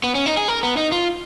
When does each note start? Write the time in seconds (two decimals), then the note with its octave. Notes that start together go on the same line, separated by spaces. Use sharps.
0.04 B3
0.15 C#4
0.26 D#4
0.37 G#4
0.48 A#4
0.63 B3
0.77 D#4
0.92 F4